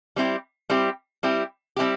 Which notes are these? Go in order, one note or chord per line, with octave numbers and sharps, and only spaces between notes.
G3 C4 E4 G4
G3 C4 E4 G4
G3 C4 E4 G4
G3 C4 E4 G4